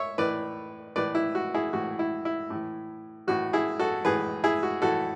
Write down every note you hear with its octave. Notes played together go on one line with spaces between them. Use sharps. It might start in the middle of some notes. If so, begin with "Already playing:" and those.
Already playing: C#5 E5
A2 E3 B4 D5
A2 E3 B4 D5
E4
F#4
E4 G#4
A2 E3 F#4
E4
E4
A2 E3
A2 E3 F#4
E4 G#4
F#4 A4
A2 E3 G#4 B4
E4 G#4
F#4
A2 E3 F#4 A4